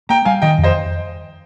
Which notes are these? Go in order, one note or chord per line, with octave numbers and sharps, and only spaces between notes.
A#3 G5 A#5
G3 F5 G#5
D#3 D#5 G5
F2
C5 D#5